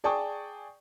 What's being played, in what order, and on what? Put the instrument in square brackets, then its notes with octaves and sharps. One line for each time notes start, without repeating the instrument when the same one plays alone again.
[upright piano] G#4 D5 G5 A5 C#6 D#6